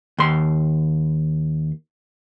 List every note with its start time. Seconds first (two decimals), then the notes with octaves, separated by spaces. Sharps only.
0.18 D#2 C6